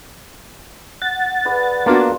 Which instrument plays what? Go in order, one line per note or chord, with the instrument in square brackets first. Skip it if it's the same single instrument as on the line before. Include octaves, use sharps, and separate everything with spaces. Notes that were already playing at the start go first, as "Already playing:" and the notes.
[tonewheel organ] F#5 A6
[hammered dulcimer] G#4 B4 D5
[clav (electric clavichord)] A#3 [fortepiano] B3 D4 F#4 [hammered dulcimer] F4